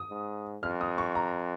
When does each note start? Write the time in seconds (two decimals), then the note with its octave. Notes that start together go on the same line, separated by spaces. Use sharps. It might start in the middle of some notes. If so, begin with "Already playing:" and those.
Already playing: D#6
0.10 G#2
0.63 F2 F6
0.81 D#6
0.98 C#6
1.15 A#5